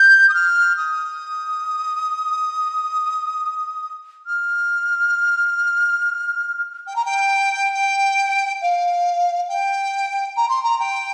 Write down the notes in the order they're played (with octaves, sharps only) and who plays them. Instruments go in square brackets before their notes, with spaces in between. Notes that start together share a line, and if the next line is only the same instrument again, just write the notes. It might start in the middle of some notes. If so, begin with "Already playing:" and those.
Already playing: [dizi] G6
D#6
F6
D#6
F6
G5
A#5
G5
G5
F5
G5
A#5
C6
A#5
G5